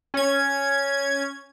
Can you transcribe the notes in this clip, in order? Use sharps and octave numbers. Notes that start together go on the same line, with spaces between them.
C#4 G#6